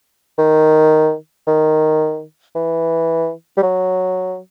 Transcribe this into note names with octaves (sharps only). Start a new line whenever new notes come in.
D#3
D#3
E3
G3
F#3